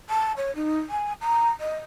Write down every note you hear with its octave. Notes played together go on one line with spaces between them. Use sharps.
A5
C#5
D#4
G#5
A#5
D#5